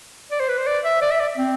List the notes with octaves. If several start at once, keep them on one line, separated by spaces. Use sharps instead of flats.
D5
C5
B4
C5
D5
E5
D5
E5
D5
C4